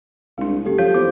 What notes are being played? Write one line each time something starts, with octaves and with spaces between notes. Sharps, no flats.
C2 G#3 D4
F#1 G4 A4
F3 C#5 F5 G6
E2 C5 D6